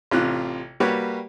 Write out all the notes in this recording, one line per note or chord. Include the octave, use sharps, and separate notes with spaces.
A1 C3 F4 F#6
G3 A#3 F#4 G4 B4 C#5